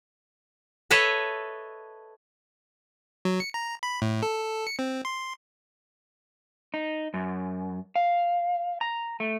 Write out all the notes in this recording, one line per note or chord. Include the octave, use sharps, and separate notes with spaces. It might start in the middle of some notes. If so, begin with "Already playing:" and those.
A4 B4 C#5 D#5 E5
F#3
C#7
A#5
B5
A2
A4
C#7
C4
C6
D#4
F#2
F5
A#5
A3